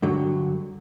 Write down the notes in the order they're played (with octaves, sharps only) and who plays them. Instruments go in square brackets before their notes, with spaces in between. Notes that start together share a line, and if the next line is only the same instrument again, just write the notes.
[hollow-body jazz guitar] G2 D3 F#3